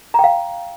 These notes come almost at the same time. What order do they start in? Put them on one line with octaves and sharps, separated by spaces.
A#5 G5 F5